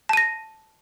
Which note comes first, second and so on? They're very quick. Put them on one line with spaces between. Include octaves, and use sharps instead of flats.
A5 D#7 A#6